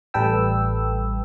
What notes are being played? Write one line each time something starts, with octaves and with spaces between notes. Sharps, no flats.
A1 G3 A4 B4 G5 E6